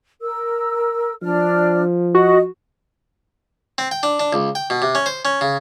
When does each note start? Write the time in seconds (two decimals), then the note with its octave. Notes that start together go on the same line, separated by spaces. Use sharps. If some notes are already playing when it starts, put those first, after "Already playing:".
0.22 A#4 E6
1.22 F3 D4 D5 F6
2.14 F#4 D#5
3.78 C4
3.91 G5
4.03 D4
4.20 D4
4.33 C#2
4.55 G5
4.70 B2
4.82 C3
4.95 C#4
5.06 C5
5.25 C#4
5.41 C#3